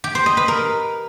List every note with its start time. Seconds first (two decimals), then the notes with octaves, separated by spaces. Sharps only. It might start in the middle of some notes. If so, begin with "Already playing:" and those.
0.04 G4
0.15 C5
0.26 D#5
0.37 B4
0.48 A#4